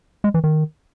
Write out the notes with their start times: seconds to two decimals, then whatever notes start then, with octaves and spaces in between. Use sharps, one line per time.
0.24 G#3
0.34 E3
0.44 D#3